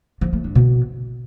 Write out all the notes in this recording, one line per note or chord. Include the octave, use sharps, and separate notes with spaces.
F3
A3
G2
B2